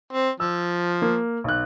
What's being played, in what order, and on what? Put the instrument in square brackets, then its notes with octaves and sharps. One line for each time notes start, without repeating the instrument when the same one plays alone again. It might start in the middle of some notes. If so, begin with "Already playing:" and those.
[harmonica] C4
[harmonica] F3 [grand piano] E6
[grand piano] A#3
B1 F#6